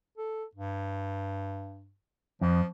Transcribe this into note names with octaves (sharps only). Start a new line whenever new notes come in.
A4
G2
F2 F3